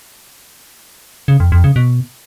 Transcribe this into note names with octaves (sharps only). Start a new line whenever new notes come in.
C#3
F2
F2
C#3
B2